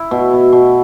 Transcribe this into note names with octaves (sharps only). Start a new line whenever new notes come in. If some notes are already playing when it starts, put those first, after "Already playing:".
Already playing: E4
B2
B2
B2